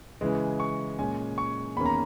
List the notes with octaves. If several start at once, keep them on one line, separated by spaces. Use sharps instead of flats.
C#3 E3 G#3
C#6
A#2 G#3 C#4 G#5
C#6
E2 D#3 A#3 C#4 B5
A#5